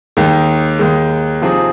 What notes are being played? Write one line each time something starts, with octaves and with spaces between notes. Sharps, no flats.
D#2 D#3 G#3
D#2 D#3 G#3
C3 F3 C4 D#4 G#4